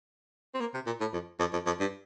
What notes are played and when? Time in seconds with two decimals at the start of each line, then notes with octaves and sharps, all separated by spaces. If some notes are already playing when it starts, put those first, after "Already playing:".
0.54 C4
0.60 A#3
0.74 C3
0.86 A#2
1.00 A2
1.13 F2
1.39 F2
1.53 F2
1.66 F2
1.80 G2